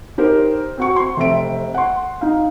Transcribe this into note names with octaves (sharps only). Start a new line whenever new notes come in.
D#4 G4 A#4 C5
C4 F#4 C#6
C6
F1 C4 E5 D7
F#5 C6
D#4 F5